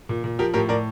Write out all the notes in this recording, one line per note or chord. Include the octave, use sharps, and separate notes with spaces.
A#2
A#2
F3 G4 A#4
A2 G4 A#4
A2 A#4 D5